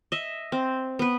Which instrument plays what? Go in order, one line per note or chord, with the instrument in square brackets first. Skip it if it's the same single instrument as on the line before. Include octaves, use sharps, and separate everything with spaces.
[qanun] D#5 E5
C4
B3 B4